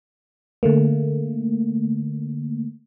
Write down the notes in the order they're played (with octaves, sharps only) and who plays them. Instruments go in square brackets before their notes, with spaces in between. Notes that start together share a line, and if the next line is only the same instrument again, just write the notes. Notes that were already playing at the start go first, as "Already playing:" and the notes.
[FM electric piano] D3 A3 A#3